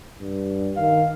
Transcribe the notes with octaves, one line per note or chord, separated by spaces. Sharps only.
G2
D#3 F5